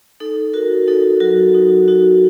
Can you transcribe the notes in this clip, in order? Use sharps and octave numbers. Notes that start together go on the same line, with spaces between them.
D#4 A4
F#4 A#4
D#4 A4
F#3 F#4
D#4
D#4 F#4